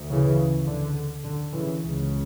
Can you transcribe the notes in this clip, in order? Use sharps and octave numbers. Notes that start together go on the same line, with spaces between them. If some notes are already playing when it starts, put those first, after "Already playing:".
Already playing: D2
C#3 E3
D3
D3
C#3 E3
C#2 C#3